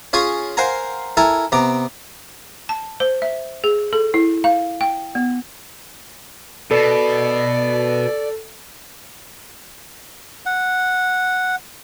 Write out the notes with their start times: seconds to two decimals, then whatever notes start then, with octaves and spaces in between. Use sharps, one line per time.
0.13 C#4 F4 G#4 C#5 C#6 D#6
0.57 A#4 C5 F5 F#5 G#5 A#5
1.17 E4 A4 A#4 G#5 A#5
1.52 C3 B3 A#5 D6
2.69 A5
3.00 C5
3.22 E5
3.64 G#4
3.93 A4
4.14 E4
4.44 F5
4.81 G5
5.15 B3
6.71 B2 A4 D5
10.46 F#5